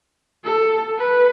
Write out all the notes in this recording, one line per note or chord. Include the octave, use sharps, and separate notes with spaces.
A4
B4